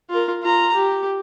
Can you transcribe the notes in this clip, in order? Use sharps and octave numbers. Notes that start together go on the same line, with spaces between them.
F4 A#4
F4 A#5
G4